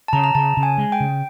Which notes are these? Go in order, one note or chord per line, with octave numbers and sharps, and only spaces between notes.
A5
C#3 A#5
A#5
C#3 A5
C#3
G#5
G#3
G5
C#3